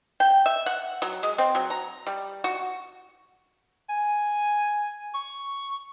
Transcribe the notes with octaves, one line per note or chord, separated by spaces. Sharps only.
G5
E5
F#5
F#3
G#3
C4
F#3
A#5
G3
F#4
G#5
C#6